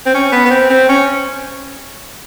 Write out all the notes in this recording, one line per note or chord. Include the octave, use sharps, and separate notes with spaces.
C4
C#4
B3
B3
C4
C4
C#4